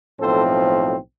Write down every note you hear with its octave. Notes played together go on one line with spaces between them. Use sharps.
B1 A2 F3 C4 A4 C5